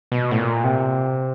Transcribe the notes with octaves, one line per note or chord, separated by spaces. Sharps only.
B2
A2
A#2
C3